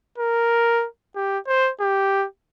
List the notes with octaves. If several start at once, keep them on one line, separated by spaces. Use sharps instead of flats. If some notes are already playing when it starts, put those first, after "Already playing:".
A#4
G4
C5
G4